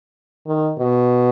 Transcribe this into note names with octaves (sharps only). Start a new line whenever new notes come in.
D#3
B2